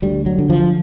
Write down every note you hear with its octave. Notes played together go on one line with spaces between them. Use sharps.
D2 G3
F#3
D3
F3